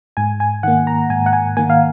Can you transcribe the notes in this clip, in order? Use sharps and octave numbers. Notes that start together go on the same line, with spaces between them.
G#2 G#5
G#5
D#3 A#3 F#5
A#5
G#2 G#5
F#5
G#5
D#3 A#3 G#5
F5